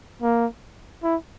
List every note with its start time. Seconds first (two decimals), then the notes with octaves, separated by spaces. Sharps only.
0.22 A#3
1.03 E4